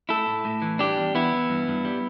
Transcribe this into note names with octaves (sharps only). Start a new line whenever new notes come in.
A3 E4 A4
A2
A2
E3
G3 D4 G4
E2
E2 B3 E4
E3
G2
G2
G3